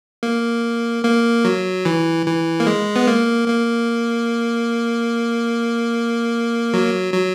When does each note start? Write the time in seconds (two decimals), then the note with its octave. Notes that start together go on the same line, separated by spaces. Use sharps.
0.23 A#3
1.04 A#3
1.45 F#3
1.85 E3
2.26 E3
2.60 A#3
2.67 G#3
2.96 B3
3.07 A#3
3.48 A#3
6.73 F#3
7.14 F#3